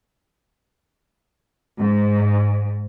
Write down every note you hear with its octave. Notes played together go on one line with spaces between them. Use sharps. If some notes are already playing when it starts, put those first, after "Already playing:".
G#2